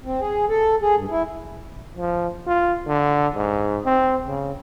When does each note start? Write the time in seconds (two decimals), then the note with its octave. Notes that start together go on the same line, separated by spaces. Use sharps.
0.05 C4
0.21 G#4
0.49 A4
0.81 G#4
0.96 G2
1.10 E4
1.97 F3
2.47 F4
2.87 D3
3.35 G#2
3.86 C4
4.27 C#3